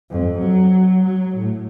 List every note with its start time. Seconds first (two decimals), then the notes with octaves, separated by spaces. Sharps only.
0.10 F2
0.40 F#3
1.05 F#3
1.36 A2